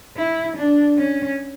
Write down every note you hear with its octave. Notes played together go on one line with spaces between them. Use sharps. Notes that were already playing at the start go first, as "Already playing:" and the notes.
E4
D4
C#4